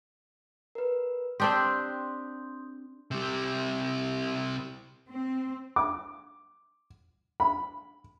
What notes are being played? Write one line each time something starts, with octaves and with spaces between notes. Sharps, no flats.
A#4 B4
C4 D4 G4 C6 D#6 G6
C3 G3
C4
D6
B5